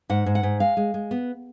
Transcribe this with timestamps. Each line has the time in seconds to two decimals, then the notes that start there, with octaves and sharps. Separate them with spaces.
0.09 G#2 F#5
0.26 G#2
0.35 F#5
0.43 G#2
0.60 G#3 F5
0.77 G#3
0.94 G#3
1.11 B3